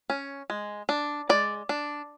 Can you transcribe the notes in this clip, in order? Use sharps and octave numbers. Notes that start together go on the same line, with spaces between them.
C#4
G#3
D4
G#3 D5
D4